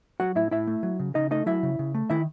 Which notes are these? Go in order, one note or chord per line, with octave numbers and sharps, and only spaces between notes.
F#3 F#4 F#5
A2 E4 E5
A2 E4 E5
A3
F#3
C#3
C#3 D#4 D#5
A3 D#4 D#5
F#3 E4 E5
C#3
C#3
A3
D#3 E4 E5